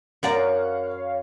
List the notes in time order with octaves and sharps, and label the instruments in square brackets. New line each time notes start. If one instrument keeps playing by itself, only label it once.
[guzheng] F#2 D5 A#5 [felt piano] A#4 F#5 [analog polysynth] C#5 F5